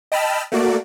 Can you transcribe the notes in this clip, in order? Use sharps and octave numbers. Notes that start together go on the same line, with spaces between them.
D#5 G5 A5 B5 E6 F6
A3 A#3 F#4 D5